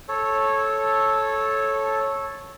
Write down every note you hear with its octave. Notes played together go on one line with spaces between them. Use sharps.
A4 C#5